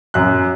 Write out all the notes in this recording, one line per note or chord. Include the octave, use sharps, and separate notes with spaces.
F#2 F#6